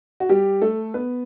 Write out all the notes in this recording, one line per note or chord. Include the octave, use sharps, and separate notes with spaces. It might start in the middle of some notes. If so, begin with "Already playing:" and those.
F#4
G3 G4
A3 A4
B3 B4